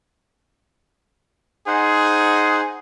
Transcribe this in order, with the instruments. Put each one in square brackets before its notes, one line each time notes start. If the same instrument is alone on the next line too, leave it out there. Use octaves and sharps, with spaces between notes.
[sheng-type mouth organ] D#4 C5 F#5 [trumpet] G#4